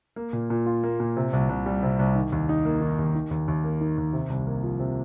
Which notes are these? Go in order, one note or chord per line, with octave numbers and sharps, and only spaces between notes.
A#3
A#2
A#2
F4
A#3
A#2
C3
C2
C2
G3
C3
C2
D#3
D#2
D#4
A#3
D#3
D#2
D#3
D#2
D#2
A#3
D#3
D#2
C3
C2
A#3
F3
C3